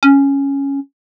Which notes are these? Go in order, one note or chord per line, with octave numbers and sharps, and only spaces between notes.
C#4